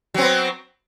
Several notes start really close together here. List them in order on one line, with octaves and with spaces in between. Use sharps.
F#3 C4 B3